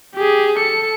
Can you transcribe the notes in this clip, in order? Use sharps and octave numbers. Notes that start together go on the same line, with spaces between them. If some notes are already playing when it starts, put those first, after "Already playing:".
G4 G#4
A4 C#7